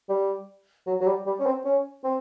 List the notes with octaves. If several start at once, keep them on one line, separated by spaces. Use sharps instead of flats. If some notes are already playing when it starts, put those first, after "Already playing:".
G3
F#3
F#3
G3
G3
C#4
C4
C#4
C4